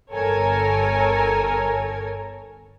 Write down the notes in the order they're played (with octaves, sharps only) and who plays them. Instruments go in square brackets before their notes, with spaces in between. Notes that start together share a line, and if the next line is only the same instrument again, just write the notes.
[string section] G1 A4 A#4 C#5 G#5